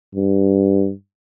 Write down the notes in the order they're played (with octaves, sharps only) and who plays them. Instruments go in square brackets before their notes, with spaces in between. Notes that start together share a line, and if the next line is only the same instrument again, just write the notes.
[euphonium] G2